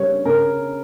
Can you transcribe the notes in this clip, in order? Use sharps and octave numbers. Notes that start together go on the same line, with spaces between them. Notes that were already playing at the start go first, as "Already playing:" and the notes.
Already playing: C#3 G3 C#5
C#3 A#4